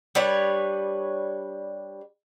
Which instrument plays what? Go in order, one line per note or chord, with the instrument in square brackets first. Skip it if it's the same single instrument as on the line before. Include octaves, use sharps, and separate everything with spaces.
[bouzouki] G3 D4 B4 C#5